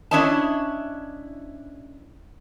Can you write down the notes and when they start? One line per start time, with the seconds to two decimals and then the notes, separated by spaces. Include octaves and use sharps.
0.11 C#4 D4 E4 C#5 D#5 A5